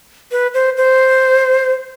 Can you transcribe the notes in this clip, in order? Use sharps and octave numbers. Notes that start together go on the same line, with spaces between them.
B4
C5
C5